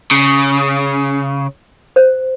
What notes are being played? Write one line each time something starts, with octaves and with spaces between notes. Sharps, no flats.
C#3
C5